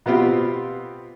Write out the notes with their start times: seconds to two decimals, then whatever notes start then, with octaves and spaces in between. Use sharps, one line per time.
0.06 B2 B3 C4 F4 G4